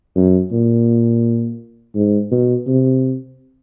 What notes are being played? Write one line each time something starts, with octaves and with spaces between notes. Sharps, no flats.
F#2
A#2
G#2
B2
C3